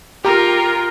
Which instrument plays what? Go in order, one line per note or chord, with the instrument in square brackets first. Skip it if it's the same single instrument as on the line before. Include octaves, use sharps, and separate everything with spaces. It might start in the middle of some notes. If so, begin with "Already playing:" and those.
[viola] F4 A#4 [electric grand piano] G4 A#5